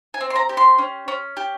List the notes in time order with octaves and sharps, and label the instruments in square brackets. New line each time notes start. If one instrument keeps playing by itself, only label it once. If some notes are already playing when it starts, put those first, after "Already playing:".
[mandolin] G#5
C4
C6
A#5
G4
C6
C#4
C#4
G4